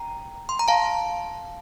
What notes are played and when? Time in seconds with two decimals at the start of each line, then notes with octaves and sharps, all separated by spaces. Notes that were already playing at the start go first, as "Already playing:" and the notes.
Already playing: G5 A#5
0.49 C6
0.59 A#5
0.68 F5 A5